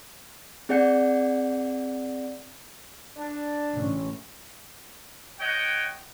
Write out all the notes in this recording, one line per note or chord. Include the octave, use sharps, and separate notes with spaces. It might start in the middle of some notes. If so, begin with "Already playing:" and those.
C4 G#4 D5 F#5 G6 C#7
D4
A1 C#3 C#4
C#5 D#5 F#5 G5